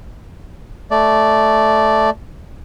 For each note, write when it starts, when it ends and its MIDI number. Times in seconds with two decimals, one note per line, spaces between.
0.91 2.10 57
0.91 2.10 74